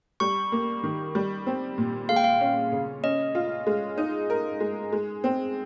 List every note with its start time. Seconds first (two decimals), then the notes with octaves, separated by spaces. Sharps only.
0.20 G3 C#6
0.52 A#3
0.83 D#3
1.15 G3
1.47 C4
1.78 A#2
2.09 G#3 F5
2.16 G5
2.24 F5
2.41 C#4
2.72 C#3
3.04 C#4 D#5
3.35 F4
3.67 G#3
3.98 D#4
4.30 A#4
4.60 G#3
4.93 G#3
5.24 C4